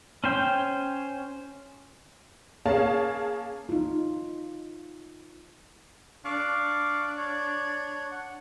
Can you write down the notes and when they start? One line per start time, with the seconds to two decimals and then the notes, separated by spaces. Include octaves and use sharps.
0.24 C#4 C5 G5
2.65 A#3 C#4 G#4 C#5 F5 A5
3.69 D#4 F4
6.25 D4 F5 C#6 D6
7.17 C#5
8.11 F#5